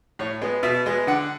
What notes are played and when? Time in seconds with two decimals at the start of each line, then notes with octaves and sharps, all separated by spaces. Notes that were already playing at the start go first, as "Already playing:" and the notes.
0.19 A2 C#5
0.41 G#3 B3
0.63 B2 E5
0.86 G#3 B3
1.07 D3 F#5